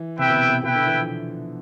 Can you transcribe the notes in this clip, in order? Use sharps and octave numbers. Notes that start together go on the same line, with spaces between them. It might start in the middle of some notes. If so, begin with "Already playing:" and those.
Already playing: E3
C3 E4 B4 E5 G5
B2
C3
B2
B2 E4 B4 E5 G5
D3
E3
F3